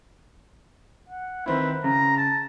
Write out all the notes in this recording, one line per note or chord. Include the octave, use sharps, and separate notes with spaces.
F#5
D#3 C4 E4 B4
C#3 A#5
A5